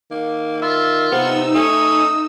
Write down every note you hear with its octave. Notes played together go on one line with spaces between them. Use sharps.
D#3 A#3
F4 E5
C3 B3 D#4 E6
A3 C#4 D#6